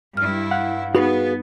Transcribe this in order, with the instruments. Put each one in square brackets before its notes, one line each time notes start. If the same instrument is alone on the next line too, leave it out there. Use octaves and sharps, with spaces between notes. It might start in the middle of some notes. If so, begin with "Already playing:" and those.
[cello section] G2 E4 [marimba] F6
[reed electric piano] F5 F#5
[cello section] B3 [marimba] D#4 [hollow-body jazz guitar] F#4 G#4 B4